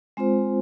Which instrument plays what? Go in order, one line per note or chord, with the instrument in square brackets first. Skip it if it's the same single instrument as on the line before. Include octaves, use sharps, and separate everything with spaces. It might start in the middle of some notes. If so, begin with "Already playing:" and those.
[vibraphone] G#3 C4 F4 C5